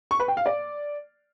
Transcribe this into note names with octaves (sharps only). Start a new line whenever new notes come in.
C#6
B4
G5
F5
D5